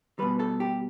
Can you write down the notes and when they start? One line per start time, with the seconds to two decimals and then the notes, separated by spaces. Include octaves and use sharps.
0.19 B2 G3 B4
0.40 A4
0.60 G4